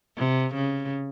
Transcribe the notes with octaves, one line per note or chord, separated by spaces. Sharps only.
C3
C#3